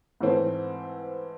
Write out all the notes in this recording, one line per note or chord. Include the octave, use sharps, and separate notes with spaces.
G#2 E3 A3 C4